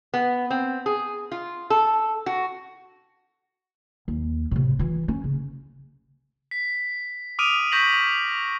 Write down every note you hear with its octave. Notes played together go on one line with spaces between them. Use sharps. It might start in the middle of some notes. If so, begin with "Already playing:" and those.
B3
C4
G#4
F4
A4
F#4
D#2
A2 C3
E3 F4
C#4
C#3
B6
D6 D#6 F6 D7 D#7 F7
C#6 G6 A#6 B6 F#7